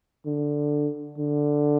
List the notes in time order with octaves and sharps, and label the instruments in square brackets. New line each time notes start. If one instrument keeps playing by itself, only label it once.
[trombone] D3
D3